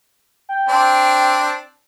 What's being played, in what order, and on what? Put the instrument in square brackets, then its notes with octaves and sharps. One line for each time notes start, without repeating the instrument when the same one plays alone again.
[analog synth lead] G5
[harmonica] C4 D4